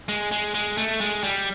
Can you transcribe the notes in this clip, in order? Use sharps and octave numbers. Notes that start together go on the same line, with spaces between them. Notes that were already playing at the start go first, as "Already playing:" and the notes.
G#3
G#3
G#3
A3
G#3
G3